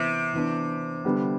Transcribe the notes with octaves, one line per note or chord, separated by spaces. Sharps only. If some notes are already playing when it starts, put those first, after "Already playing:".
Already playing: C3 E3 B3 E4
E3 B3 D4
D3 G3 B3